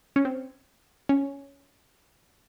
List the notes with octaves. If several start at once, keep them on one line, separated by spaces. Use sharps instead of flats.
C#4
C4
C#4